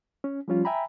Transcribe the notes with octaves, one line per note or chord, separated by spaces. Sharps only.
C#4
F3 G3 C#4 F4
E5 G5 G#5 A#5 B5